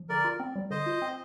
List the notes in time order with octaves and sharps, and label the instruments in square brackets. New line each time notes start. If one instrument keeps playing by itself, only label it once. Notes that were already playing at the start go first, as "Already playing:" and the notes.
Already playing: [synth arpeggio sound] F3
[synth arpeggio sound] D3 [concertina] A#4 D5
[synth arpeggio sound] F4
C4
G3
[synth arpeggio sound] D3 [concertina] C5 D#5
[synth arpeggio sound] F4
C4